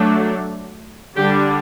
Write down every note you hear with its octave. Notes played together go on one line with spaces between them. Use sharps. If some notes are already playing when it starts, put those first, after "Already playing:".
Already playing: F#3 A3 D4
D3 G3 D4 G4